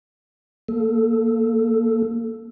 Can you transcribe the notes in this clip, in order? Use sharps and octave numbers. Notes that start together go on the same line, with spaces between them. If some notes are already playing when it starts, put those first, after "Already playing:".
A#3 A4